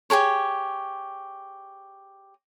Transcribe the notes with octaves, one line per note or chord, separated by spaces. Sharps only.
G4 G#4 A#4 C#5